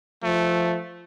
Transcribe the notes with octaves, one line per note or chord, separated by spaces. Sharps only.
F3 A3